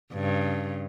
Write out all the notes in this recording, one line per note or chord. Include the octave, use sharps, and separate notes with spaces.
G2 C#3